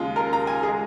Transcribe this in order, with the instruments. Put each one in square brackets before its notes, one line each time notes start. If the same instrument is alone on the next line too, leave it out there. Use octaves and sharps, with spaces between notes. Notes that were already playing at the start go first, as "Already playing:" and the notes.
Already playing: [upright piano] D#2 C#3 G#3 F4
A#4
A#5
G#5
G#4
G#3